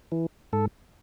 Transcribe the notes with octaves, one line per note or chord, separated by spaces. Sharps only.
E3
G#2 A4